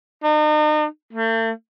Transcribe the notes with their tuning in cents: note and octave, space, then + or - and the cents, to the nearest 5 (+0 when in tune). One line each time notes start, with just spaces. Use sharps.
D#4 -40
A3 +40